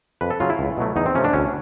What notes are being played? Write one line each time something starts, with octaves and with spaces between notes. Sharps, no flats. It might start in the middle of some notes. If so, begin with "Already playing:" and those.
F2 B4
A4
C#3 F#3 F4
E4
C#2
B2 F#3 A3
E2 D#4
C4
C3 F3 A3 C#4
D4
D2 C#4